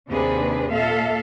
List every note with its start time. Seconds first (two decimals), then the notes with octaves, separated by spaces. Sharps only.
0.11 D#2 C3 C4 D4 G#4 B4
0.73 A#2 A4 E5 F5